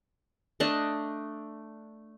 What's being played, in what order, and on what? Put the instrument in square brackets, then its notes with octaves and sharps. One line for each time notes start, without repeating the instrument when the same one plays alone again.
[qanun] A3 D4 D5 D#5